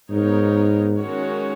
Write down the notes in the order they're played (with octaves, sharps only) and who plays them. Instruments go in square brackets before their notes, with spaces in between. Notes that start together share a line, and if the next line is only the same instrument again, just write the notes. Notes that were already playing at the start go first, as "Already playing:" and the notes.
[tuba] G#2 [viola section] B3 D#4 A#4 C#5
[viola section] D#3 G#3 C#4 F#4 C#5